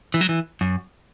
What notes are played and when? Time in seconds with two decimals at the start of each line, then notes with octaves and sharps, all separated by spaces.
0.14 E3
0.21 F#3
0.29 E3
0.61 F#2